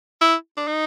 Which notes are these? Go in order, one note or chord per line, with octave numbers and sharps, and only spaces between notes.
E4
D4
D#4